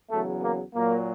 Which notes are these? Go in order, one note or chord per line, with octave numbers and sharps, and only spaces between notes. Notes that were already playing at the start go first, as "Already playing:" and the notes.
E2 C#3 F#3 A3
A#3
A#2 F#3 A#3